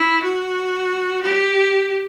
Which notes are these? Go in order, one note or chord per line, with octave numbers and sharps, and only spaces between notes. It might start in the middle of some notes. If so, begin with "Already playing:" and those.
Already playing: E4
F#4
G4